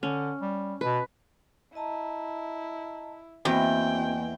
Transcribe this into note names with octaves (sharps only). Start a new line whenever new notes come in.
D3 C#4
G3
B2 B4
E4 D#5 A5 A#5
E2 A#3 C4 F#4 D#5 G5 G#5